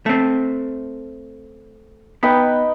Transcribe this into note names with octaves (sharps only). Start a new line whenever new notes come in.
A3 C4
B3 D#4 B4 G5